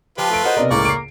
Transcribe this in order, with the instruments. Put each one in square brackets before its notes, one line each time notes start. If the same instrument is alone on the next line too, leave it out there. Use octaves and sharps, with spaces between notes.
[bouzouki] F3 [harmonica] F4 B4 [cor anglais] G4
[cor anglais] A3 [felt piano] A4 D7
[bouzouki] A#3 F#4 C5 [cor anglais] D#5
[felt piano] C3 B3 D5 [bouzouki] A#4
[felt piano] C#2 A2 [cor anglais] A#3 [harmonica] D5 C#6 D6
[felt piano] C7 D7